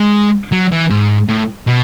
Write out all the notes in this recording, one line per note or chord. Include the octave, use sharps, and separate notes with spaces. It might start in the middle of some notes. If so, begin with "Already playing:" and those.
Already playing: G#3
F#3
E3
G#2
A2
B2